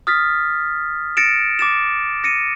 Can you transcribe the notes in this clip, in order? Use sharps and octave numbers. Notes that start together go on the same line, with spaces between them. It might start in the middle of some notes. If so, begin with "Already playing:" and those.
D#6 F6 A6 B6
A6 A#6 C#7 D7 E7
D6 A6 E7
A#6 C#7 D#7